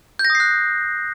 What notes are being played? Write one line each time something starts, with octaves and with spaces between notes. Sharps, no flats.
G6
A#6
D#6
C7
F#6